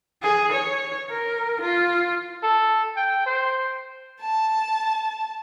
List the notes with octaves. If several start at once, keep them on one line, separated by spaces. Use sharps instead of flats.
G#4
C#5
A#4
F4
A4
G5
C5
A5